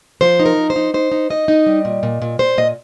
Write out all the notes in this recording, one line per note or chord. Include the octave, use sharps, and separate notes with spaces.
F3 C5
D#4
A#4
F3
C5
D#4
D#4 C5
D#4
D#4 D#5
D#4
G3
A#2
A#2
A#2
A#2 C5
A#2 D#5